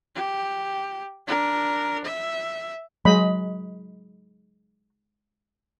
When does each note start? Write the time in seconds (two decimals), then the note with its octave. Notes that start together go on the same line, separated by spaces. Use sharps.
0.15 G4
1.27 D4 A#4
2.05 E5
3.05 F#3 G#3 D#5 B5